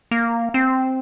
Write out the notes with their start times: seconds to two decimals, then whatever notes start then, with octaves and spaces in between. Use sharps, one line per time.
0.11 A#3
0.54 C4